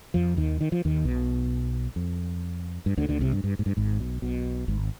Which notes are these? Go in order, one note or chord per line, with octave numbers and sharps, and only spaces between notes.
F2 F3
D#2 D#3
D#3
F3
D#2 D#3
B1 B2
F2
G2
D2 D3
D2 D3
C2 C3
G2
G2
G#2
G2
G#1 G#2
B1 B2
B1 B2
G#1 G#2